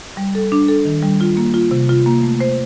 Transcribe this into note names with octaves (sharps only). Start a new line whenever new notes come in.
G3
A4
D4
A4
D#3
G3
F4
A#3
F4
C3
F4
A#3
A3
C5